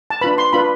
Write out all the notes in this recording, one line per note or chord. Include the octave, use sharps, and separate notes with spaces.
A5
D4 F4 B4 B5
C6
D4 F4 B4 B5